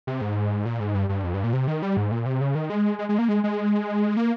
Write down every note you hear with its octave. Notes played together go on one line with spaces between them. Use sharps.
C3
G#2
A#2
G#2
G2
G2
F2
G2
A#2
C3
D#3
G3
G#2
A#2
C3
C#3
D#3
G#3
G#3
G#3
A#3
G#3
G#3
A#3